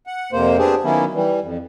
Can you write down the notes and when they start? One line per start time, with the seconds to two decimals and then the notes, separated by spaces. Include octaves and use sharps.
0.07 F#5
0.32 F2 C3 A#3 C5
0.58 B3 C4 D4 G4 G#4
0.84 D#3 F#3 A#3 B3 C#4 E4
1.14 E3 G3
1.42 F2